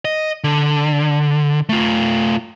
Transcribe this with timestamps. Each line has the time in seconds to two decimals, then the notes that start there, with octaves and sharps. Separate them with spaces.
0.05 D#5
0.44 D3
1.69 A3 F4